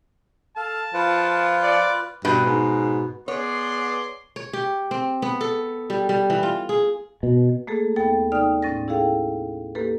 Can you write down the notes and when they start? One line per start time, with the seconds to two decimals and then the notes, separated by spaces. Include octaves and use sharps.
0.57 A4 F5 A5
0.94 F3 F4 B4
1.63 D5
2.25 G2 B2
2.46 G#2
3.28 B3 G#4 C#5 D5 C6
4.36 C#5
4.53 G4
4.91 C4
5.22 B3
5.41 A4
5.90 G3
6.09 G3
6.30 E3
6.43 F4
6.69 G#4
7.23 B2
7.67 A3 A#3 G#4 A4
7.96 D#2 B3 A4 G5 A6
8.32 C3 D#4 D5 G5 D#6 F6
8.62 A2 C#4 A6 A#6
8.88 E4 G#4 A4 F5 G5
9.75 A#3 G4 A4 B4